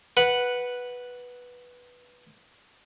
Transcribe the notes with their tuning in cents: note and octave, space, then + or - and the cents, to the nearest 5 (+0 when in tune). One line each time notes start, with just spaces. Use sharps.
B4 -5 F#5 +0